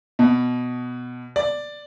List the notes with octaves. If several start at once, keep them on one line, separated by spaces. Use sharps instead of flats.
B2
D5